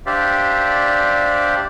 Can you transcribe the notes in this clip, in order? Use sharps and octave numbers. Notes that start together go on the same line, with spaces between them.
D4 G4 C5 D5 E5 F5